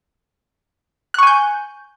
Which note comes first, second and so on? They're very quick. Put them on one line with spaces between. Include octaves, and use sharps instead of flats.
F#6 C#6 G#5 G6